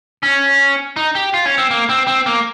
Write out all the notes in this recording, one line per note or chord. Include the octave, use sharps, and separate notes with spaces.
C#4
D#4
G4
F4
C#4
C4
A#3
C4
C4
A#3